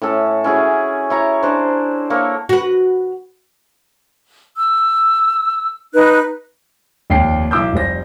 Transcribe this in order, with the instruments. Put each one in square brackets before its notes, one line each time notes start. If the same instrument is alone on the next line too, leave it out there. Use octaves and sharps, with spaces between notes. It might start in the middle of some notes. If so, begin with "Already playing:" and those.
[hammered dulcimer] A2 C#4 A4
C#4 E4 F#4 G#4
E4 C#5 A#5
D4 C5
A#3 A4 C#5
[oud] F#4 B4
[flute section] E6
D#4 B4 F#6
[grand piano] F1 D#2 G5 C7
B1 E4 D6 E6 G6
F1 G3 C5 A#6